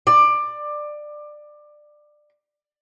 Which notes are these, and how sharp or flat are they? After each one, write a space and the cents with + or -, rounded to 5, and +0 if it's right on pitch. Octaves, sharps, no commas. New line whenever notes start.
D5 +20